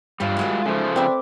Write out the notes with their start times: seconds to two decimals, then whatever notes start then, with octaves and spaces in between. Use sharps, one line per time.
0.20 E2 G2 G3 F4
0.37 D#3 F#3 G#3
0.66 C#3 F3 A3 C5
0.96 C4 D4 B4 E5 D6